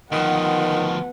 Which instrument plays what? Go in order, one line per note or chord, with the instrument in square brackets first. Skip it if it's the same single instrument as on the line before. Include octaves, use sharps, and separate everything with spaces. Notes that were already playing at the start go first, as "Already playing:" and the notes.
[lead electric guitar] D2 F3 [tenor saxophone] D#3 [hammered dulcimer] B3 B4 [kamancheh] F#5